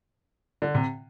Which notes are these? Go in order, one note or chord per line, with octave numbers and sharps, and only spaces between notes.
D3
C3